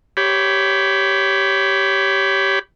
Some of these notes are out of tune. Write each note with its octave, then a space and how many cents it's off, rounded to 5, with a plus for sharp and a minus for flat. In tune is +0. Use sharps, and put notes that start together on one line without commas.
G4 -10 C#5 +5 B5 +10